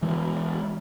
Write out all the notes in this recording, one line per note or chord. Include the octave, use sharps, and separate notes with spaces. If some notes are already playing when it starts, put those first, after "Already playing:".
E3 G#3 A3 B3